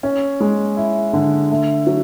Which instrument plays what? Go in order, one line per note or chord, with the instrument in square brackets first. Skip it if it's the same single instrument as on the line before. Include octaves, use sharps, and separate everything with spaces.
[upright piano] C#4
G#3
E4
D3
A3
F#3